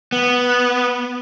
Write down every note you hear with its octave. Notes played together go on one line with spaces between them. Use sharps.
B3